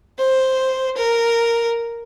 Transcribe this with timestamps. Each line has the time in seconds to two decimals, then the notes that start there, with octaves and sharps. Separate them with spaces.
0.19 C5
0.97 A#4